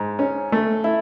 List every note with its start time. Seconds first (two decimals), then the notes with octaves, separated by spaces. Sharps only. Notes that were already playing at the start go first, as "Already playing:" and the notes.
Already playing: G#2
0.19 C#4
0.52 A3
0.84 E4